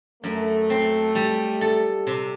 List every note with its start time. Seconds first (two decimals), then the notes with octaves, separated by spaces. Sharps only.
0.23 F#2 A3
0.70 C4
1.15 G3
1.61 A4
2.07 C3